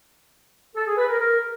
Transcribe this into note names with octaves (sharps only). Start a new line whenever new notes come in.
A4
G#4
B4
A#4
A#4